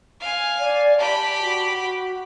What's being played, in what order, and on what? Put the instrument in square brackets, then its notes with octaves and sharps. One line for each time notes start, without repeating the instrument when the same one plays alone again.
[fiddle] F5 G#5
[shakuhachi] D5
[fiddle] G4 B5 [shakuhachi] A5
[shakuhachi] F#4